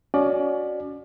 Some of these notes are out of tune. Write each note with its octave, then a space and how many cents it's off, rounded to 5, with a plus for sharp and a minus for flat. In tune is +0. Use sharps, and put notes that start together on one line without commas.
C#4 +35 F#4 +0 D5 +30